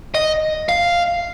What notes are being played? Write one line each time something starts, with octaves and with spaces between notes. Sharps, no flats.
D#5
F5